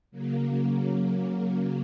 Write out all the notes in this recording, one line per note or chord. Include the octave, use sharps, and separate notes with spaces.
C#3 F#3 A#3